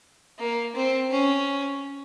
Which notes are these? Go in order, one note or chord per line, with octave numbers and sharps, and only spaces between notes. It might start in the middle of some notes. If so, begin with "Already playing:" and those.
A#3
C4
C#4